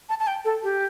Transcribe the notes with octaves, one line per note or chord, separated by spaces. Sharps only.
A5
A5
G5
A4
G4